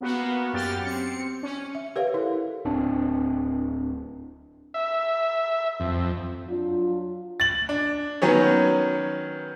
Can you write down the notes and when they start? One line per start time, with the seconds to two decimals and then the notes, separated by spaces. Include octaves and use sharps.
0.01 A#3 B3 F#4
0.53 F#2 G4 F6 A6
0.85 C4 C#7
1.43 C#4
1.75 E5
1.96 G4 A#4 B4 C#5 E5 F5
2.14 E4 A4
2.65 D1 C4 D4
4.74 E5
5.80 F2
6.48 F#3 D4 F4
7.40 A6 F#7
7.69 D4
8.22 D#3 F#3 B3 C#4